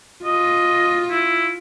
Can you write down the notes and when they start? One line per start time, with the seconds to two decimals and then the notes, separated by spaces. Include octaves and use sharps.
0.25 F4 D#5
1.10 E4